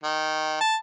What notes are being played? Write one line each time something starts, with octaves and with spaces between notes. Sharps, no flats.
D#3
A5